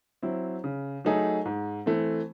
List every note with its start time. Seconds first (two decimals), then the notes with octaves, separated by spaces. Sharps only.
0.22 F#3 C4 E4
0.64 C#3
1.05 F#3 A3 D#4 G#4
1.46 G#2
1.86 E3 A3 C4